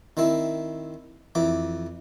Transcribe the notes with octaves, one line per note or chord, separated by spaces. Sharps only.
D#3 C4 E4
F2 E3 D6